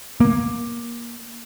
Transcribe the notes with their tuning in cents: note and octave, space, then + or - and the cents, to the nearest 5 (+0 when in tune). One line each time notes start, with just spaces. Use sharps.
A#3 +20